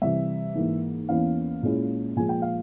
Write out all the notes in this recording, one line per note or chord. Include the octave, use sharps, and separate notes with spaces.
C3 E3 G3 E5
G#2 E3 A#3
E2 E3 A#3 C#4 E4 F5
A#2 G#3 C#4 E4
A#2 F3 G#3 G#5
G5
F5